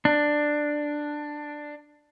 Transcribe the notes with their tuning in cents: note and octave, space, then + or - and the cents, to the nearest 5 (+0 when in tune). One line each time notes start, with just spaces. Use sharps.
D4 +10